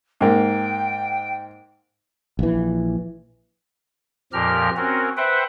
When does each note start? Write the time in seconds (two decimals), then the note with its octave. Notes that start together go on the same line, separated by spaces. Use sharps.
0.21 G#2 A#3 G5
2.39 A#1 E3
4.33 F2 A#2 F3 G4 A#4 F6
4.77 C4 C#4 F#4 A#4
5.17 B4 C5 E5 F#5 G5